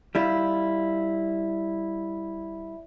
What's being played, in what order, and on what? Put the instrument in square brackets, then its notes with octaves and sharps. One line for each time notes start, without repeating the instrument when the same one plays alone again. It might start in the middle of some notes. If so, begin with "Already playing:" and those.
[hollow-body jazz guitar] G3 E4 F4